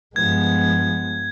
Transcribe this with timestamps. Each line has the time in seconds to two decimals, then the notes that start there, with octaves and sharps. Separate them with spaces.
0.16 G2 F3 G#3 B3 G#6